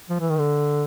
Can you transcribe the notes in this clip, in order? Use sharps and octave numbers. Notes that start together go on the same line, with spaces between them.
F3
E3
D#3
D3